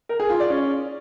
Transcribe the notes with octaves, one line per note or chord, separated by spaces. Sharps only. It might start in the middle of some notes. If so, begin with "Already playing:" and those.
A#4
G#4
F4
D5
C#4